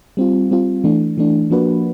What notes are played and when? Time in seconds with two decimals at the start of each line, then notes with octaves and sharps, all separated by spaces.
0.17 G3 C4 F4
0.51 G3 C4 F4
0.84 E3 A3 D4
1.18 E3 A3 D4
1.50 F3 A#3 D4 F#4 B4